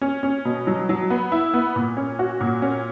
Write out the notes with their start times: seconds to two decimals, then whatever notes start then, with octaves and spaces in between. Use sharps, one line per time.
0.01 C#4
0.23 C#4
0.45 B2
0.67 F#3
0.89 F#3
1.10 B3
1.32 E4
1.54 B3
1.76 A#2
1.97 C#4
2.19 F#4
2.41 A#2
2.62 C#4